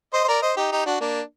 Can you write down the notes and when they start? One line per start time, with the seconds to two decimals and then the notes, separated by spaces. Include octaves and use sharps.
0.14 C5 D#5
0.24 C5
0.28 A#4 D5
0.42 C5 D#5
0.57 D#4 G4
0.72 D#4 G4
0.86 D4 F#4
1.01 A#3 D4